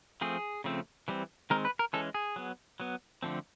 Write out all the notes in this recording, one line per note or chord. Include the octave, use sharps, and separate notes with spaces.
F3 A3 C4 G#4
C#3 F3 A3 C4
E3 G3 C4
D#3 G#3 C4 A#4
B4
A#4
E3 G#3 C#4 A4
G#4
F#3 B3
F#3 B3
D3 F3 A3 C4